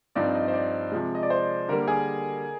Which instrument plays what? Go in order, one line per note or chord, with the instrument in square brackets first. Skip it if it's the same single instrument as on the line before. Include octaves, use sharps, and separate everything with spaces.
[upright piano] G2 F3 C4 D#4 [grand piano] D5
[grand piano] D#5
C5
D5
[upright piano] C3 F3 G#3
[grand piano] D#5
D5
C5
[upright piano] D3 G3 A#3 [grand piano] A#4
[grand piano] G#4